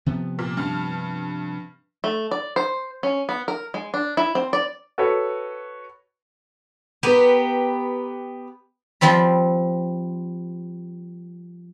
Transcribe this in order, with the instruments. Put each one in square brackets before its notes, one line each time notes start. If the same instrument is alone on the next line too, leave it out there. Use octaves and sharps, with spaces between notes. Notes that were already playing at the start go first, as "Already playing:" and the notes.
[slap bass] C3 F3 B3
[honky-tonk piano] A#2
G2 A5 F6
[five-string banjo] A3
D5
C5
C#4
B3
A#4
G#3
D4
E4
C4
D5
[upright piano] F#4 A4 B4 C#5
[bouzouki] B3 G4 [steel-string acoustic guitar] A#4 B4
[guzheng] F3 G3 C4 B5